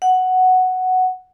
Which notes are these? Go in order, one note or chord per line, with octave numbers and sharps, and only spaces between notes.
F#5